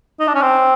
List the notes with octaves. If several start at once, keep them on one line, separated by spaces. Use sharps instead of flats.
D#4
D4
C#4
C4